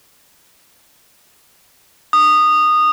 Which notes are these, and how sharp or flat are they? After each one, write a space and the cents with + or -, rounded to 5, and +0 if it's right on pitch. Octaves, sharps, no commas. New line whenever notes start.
D#6 -15